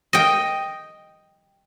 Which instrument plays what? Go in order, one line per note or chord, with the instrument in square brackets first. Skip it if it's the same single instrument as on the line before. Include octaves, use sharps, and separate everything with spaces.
[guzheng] D#5 G5